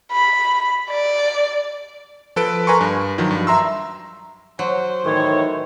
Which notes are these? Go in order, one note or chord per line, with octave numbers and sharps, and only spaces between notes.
B5
D5
F3 A4 B4 D7
A#4 B4 G#5 A#5 C6 C#6
G2
D#3 F3 F#3
G2
E5 A#5 C6 E6
F#3 C5
A2 D#3 E3 C#5